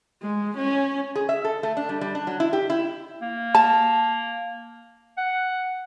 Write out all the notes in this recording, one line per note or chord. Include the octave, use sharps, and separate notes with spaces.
G#3
C#4
G#4
E5
A4
A3
D4
G3
G3
D4
F#3
E4
G4
E4
A#3
A5
F#5